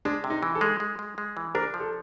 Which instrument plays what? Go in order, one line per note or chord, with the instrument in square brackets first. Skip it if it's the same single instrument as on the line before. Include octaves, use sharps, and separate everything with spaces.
[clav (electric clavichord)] G#3 [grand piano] D4
[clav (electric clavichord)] C3
[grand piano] D#4
[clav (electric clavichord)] E3
[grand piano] A4
[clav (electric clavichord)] G#3
G#3
G#3
G#3
E3
[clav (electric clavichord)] D4 [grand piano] A#4
[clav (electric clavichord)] F3
[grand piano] A4